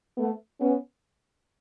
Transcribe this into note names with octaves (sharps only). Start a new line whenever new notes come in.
A3 B3
B3 C#4